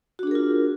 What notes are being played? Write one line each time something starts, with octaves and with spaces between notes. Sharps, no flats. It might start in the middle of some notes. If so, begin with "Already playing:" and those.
D4 F4 F#4 G#4 A#4